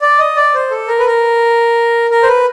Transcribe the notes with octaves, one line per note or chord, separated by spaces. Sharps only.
D5
D#5
D5
C5
A4
A#4
B4
A#4
A#4
C5
B4